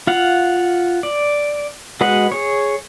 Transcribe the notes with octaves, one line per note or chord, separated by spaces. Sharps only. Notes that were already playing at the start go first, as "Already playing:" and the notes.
F4 F5 F#5
D5
G#3 F#4 B4 D#5 F#5
G#4 C#5